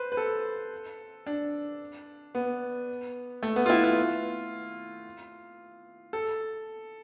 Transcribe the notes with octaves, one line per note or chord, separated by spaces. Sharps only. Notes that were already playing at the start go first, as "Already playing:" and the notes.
Already playing: B4 C5
B4
A4
D4
B3
A3
B3
F4
E4
F4
A4